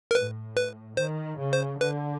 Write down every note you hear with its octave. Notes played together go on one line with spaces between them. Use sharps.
A#4
A2 B4
B4
D#3 C5
C#3
C5
D3 B4